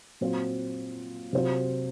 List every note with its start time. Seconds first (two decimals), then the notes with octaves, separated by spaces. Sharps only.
0.21 A#2 F#3 C4 F4
1.33 C3 F#3 C4 F4